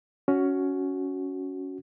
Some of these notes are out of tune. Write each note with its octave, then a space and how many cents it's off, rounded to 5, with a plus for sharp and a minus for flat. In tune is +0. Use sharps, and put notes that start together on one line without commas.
C#4 +10 F#4 +0